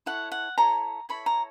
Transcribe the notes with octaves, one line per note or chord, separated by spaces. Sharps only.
E4 A4 C#5 F#5
F#5
E4 A4 C#5 A#5
E4 A4 C#5 B5
A#5